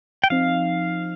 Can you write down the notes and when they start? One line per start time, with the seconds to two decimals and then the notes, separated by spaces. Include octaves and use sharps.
0.24 G5
0.30 F3 C4 D#4 F5